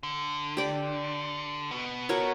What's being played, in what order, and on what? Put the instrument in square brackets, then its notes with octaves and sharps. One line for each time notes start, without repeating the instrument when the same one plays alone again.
[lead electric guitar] D3
[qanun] G4 D5
[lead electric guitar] B2 B3
[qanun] F#4 A#4 C#5